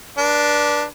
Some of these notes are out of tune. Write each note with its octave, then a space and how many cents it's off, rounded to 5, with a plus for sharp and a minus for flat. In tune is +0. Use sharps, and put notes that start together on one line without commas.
D4 +0 B4 -40